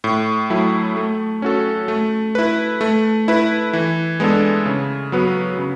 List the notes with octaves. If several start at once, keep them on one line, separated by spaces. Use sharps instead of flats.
A2
F#3 A3 E4
A3
C#4 F#4 A4
A3
E4 B4
A3
E4 B4
E3
G#3 B3 D4 A4
C#3
F#3 B3 F#4 B4
C#3